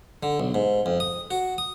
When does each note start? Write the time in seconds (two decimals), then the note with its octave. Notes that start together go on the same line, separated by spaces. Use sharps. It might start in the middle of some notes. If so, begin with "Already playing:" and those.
0.23 D3
0.40 B1
0.54 G#2
0.86 F2
1.00 D#6
1.31 F#4
1.58 D#6